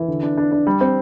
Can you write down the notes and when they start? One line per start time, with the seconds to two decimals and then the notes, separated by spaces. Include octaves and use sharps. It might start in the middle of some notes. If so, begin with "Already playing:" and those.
Already playing: E3
0.08 D3
0.23 D4
0.37 D4
0.52 D4
0.67 G3
0.81 C4